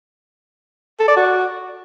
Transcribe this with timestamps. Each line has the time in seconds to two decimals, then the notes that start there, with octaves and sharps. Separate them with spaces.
0.99 A4
1.08 D5
1.16 F#4